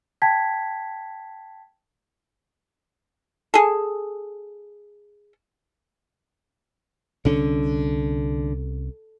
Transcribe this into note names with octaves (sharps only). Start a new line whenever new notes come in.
G5 A5 G#6 B6
G#4 A4
C2 D3 C#4